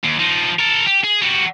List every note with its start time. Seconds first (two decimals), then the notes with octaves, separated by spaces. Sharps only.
0.04 D#2
0.19 F3 D#4
0.59 A4 A#4
0.87 G4
1.04 G#4
1.22 G3 F#4